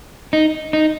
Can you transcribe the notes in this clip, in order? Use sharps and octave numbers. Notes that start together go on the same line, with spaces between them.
D#4
D#4